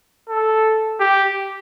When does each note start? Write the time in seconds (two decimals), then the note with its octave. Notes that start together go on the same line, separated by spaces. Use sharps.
0.29 A4
1.00 G4